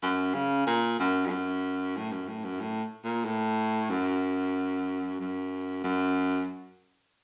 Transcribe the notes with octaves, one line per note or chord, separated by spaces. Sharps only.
F#2
C#3
A#2
F#2
F2
F#2
A2
F#2
A2
F#2
A2
A#2
A2
F#2
F#2
F#2